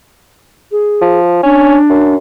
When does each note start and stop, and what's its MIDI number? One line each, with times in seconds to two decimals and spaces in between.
0.72 1.19 68
1.01 1.41 53
1.43 1.77 61
1.43 2.14 62
1.90 2.16 42